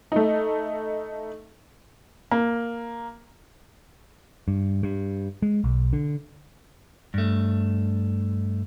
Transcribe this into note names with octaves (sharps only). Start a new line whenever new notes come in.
A3 D#4
A#3
G2
G2
G#3
B1
D3
G2 A3